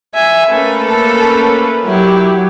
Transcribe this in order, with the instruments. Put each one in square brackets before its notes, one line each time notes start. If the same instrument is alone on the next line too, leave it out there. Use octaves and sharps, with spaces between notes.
[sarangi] E5 [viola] G#5
[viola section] A3 A#3 C#4 [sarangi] A4 [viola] B4
[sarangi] A4
[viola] F#3 G4 [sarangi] E4